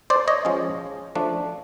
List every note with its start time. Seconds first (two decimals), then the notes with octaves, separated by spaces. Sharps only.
0.10 C5 D5
0.28 C#5 D#5
0.45 F3 G#3 C#4
1.15 F3 A3 D4